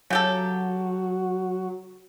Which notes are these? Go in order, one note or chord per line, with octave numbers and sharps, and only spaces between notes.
C#3 F#3 G4 A4